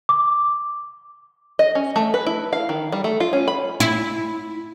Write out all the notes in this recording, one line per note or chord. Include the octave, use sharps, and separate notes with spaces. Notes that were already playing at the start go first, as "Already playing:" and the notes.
D6
D#5
C#4
A3
B4
E4
F5
D#3
G3
A3
F4
C#4
B5
E4